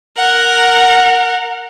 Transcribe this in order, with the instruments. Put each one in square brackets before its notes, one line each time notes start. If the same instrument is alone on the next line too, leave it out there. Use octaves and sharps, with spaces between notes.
[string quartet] A#4 F#5